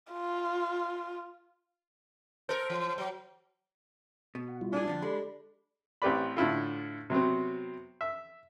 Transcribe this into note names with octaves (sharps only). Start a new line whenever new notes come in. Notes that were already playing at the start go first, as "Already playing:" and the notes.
F4
A4 A#4 C5
E3
F#3
B2
F#5
G3 E4 F4
A#2 D4 G#4
F2 D3 F3
G#3 G4 A4 D5 B5
A1 C4 G4 B4 D5 B5
A2 D3 E4 F4
C3 F#3 B3 C4
E5